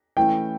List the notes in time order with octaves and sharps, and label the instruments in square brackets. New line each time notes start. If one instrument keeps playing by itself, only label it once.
[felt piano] E3 A3 C#4 E4 [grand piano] G5